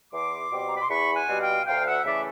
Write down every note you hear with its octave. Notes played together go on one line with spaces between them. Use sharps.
E2 C6 D6
B2 G3 C4
A#5
B5
C6
E2 B5 C#6
F#5 G#5
B2 G3 C4
F5 G5
D2 F5 G5
E5 F#5
C#3 E3 A3 D5 E5